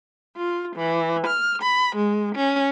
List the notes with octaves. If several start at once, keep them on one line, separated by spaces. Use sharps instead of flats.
F4
E3
F6
B5
G#3
C#4